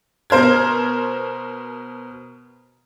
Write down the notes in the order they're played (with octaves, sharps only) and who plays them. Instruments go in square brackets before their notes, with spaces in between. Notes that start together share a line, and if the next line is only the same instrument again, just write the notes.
[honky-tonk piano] B2 A#4 C5 F6 G#6